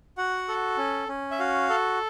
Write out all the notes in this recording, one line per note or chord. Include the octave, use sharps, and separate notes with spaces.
F#4 F#5
A4
C#4
C#4
E5
F#4 F5
A4